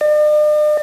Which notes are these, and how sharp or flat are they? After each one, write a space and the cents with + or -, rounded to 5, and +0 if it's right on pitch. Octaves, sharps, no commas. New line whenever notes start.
D5 +45